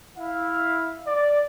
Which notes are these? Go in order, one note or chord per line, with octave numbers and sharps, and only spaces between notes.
E4 F5
D5